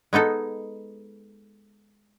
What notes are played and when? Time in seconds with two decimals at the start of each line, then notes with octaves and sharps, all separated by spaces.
0.13 G#3 B3 D#4 A4